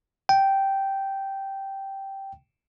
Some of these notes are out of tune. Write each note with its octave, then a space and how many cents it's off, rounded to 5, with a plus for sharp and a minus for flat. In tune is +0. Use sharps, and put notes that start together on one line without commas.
G5 -5